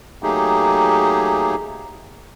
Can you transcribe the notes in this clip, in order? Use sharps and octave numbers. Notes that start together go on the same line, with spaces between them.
F#3 A3 A#3 D#4 G4 G#4